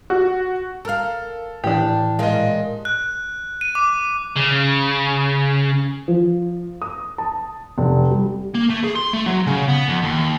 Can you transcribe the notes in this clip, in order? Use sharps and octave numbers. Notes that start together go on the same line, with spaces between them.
F#4
A4 A#4 F5 F6
A2 E3 D4 G4
A#2 G#3 A#4 D#5 F5
F#6
D#7
D6
C#3
F3
D#6
A5
F1
G3
A#3
A3
G#4
C6
A3
F#3
C#3
B3
F2
D#2